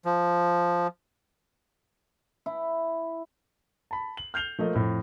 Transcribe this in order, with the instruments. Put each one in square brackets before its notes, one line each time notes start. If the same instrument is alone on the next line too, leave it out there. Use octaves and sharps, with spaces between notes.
[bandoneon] F3
[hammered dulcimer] E4
[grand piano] A5 B5
F#7
F6 G6 C7 F7 G7
F3 A3 A#3 D#5
F2 A2